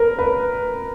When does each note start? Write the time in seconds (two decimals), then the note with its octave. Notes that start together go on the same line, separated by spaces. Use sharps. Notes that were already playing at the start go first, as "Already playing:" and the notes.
Already playing: A#4 B4
0.19 B4